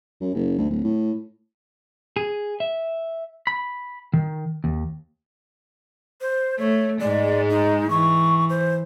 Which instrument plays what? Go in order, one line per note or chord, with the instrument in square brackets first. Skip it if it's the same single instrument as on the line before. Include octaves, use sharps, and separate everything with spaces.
[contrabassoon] F#2
F#1
D2
D1
A2
[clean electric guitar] G#4
E5
B5
D#3
D#2
[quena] C5
[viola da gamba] A3 [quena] C#5
[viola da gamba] G#2 G#3 [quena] D5
[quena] D#4
[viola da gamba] E3 [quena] C#6
[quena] C5